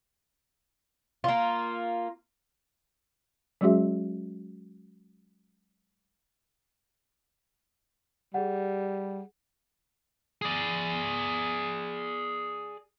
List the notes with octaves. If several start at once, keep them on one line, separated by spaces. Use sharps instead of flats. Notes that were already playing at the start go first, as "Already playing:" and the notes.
A#3 F4
F#3 G#3 C#4 F#4 G#4 E5
G3 G#4 F#5
G#4 D5